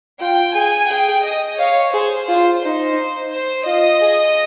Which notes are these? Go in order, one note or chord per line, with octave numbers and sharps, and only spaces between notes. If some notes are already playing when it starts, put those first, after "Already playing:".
F4 G5
G#4 G#5
G#4 G5
D#5
C#5 F5
G#4 C5
F4 C5
D#4 C5
C5
F4 D#5
G#4